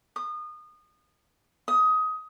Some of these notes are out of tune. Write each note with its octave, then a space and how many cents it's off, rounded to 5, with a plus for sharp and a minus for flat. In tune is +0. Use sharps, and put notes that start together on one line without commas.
D#6 -30
D#6 +20